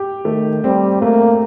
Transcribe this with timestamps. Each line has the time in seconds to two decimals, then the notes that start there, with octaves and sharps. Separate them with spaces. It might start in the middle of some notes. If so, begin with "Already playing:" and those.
Already playing: G4
0.25 D#3 A3
0.64 G3 C4
1.01 A3 A#3